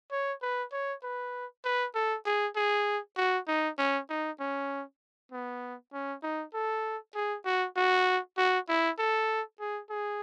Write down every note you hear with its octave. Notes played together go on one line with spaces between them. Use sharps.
C#5
B4
C#5
B4
B4
A4
G#4
G#4
F#4
D#4
C#4
D#4
C#4
B3
C#4
D#4
A4
G#4
F#4
F#4
F#4
E4
A4
G#4
G#4